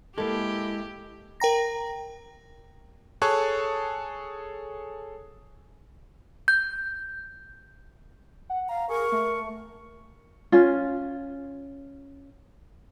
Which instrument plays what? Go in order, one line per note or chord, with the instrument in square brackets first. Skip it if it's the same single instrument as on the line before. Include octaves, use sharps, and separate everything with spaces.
[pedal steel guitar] G#3 E4 [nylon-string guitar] A#3 A4 [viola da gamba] G4
[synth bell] A#4 G5 A#5 A#6
[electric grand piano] G#4 A4 C#5 A5 C#6 F#6
[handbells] G6
[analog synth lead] F#5
[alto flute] F5 [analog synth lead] A#5
[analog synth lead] G#4 [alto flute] A#4 [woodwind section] C#6
[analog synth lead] A3
[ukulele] C#4 F4